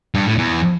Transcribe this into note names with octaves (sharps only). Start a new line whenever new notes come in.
G2
A2
E2